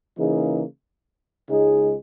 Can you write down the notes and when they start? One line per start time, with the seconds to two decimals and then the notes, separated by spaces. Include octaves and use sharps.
0.17 C#3 E3 A#3 D#4 G#4
1.48 C#2 C#3 G#3 D#4 G#4